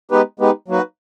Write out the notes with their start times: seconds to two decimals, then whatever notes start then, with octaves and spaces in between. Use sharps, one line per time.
0.11 G#3 B3 D#4 G4 B4
0.40 G#3 B3 D#4 G4 B4
0.68 F#3 A#3 D#4 F#4 B4